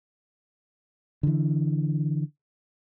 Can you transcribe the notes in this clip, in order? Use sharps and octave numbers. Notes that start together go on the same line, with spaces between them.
D3 E3